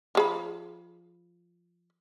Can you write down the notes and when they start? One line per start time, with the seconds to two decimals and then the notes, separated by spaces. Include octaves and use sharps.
0.15 F3 G#4 B5